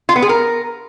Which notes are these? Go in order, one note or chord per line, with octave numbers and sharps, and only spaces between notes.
F4
B3
G#4
A#4